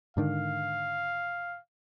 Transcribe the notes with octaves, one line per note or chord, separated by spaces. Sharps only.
G#2 D3 D#3 F5